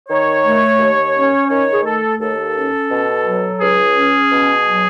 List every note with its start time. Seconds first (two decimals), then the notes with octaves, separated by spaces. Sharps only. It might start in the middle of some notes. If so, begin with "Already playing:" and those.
0.08 D#3 C#5
0.44 A3
0.78 D#2
1.14 C#4
1.48 D#3 C#5
1.72 G#4
1.83 A3 A4
2.19 D#2 A4
2.54 C#4
2.89 B2
3.24 F#3
3.59 C#2 G#4
3.94 C#4
4.30 B2
4.65 F#3